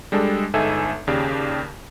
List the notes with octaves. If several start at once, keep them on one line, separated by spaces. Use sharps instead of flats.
G3 G#3 D4 A4
G1 G#3 D#4 A4 E5 G#5
D#2 C#3 G4 D5